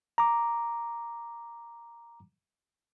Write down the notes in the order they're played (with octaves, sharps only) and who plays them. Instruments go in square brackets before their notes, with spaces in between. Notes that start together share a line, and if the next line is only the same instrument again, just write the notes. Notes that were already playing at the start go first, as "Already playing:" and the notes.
[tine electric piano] A#5 D6